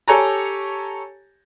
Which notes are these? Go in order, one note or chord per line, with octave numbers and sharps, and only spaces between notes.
G4 A4 C#5 G#5 A#5